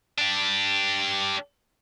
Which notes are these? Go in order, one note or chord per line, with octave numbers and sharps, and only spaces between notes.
D4 G4